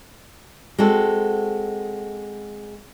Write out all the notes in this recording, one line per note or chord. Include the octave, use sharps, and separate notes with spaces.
G#3 C4 F#4 A4